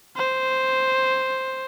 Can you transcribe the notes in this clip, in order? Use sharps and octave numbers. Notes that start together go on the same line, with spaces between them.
C5